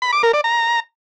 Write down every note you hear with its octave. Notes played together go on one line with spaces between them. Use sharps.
B5
D6
A#4
D5
A#5